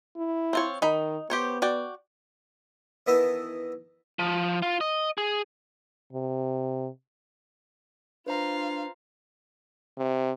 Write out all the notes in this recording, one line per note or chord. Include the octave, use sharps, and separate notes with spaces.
E4
C4 F4 C#5
D#3 D#4 B5
B3 G4 C5 C#5
F#4 D5 G5
D#3 E3 B3 E4 D#5 A5
F3
F4
D#5
G#4
C3
D4 F4 B4 C5 F5 A#5
C3